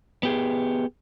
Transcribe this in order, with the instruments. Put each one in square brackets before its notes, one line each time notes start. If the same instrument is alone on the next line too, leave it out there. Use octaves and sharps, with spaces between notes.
[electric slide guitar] B3 G4 G#4